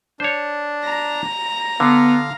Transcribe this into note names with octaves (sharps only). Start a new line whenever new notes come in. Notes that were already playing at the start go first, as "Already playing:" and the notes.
D4 C5 C#5
A#5
D3 B3 F5